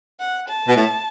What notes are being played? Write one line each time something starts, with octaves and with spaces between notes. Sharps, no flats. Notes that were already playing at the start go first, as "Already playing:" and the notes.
F#5
A5
B2
A2